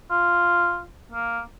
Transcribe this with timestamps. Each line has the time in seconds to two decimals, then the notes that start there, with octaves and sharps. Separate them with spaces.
0.11 F4
1.12 A#3